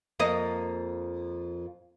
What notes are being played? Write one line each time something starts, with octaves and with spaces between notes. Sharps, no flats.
F2 A#3 D#5